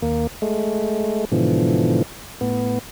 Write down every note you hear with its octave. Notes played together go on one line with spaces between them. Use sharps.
D#2 A#3
G#3 A3
G#2 B2 D3 E3 F3
A2 B3